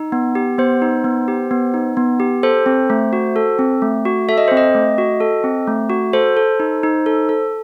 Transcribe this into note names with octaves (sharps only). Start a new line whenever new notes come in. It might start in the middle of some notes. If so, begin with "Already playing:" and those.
Already playing: D#4
B3
G4
B3 C5
D#4
B3
G4
B3
D#4
B3
G4
A4 C5
C4
A3
F#4
A4
C4
A3
F#4
A4 E5
D#5
C4 C5
D#5
A3
F#4
A4
C4
A3
F#4
A4 C5
A4
D#4
D#4
A4
A4